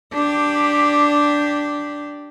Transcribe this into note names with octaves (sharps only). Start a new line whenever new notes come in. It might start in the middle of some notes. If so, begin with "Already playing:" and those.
D4 G4